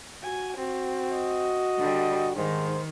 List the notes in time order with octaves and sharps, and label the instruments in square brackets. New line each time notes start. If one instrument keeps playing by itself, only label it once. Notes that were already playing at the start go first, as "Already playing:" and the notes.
[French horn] F#4 [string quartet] G#5
[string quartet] C4 [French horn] F#4
[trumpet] D#5
[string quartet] D3 G3
[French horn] G#2 [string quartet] D#3 [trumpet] C5